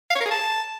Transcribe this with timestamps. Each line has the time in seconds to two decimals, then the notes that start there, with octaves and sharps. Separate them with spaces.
0.10 F5
0.15 C#5
0.21 A#4
0.26 G#4
0.31 A5